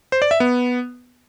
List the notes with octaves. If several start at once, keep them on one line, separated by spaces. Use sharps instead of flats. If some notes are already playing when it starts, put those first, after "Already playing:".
C5
D5
E5
B3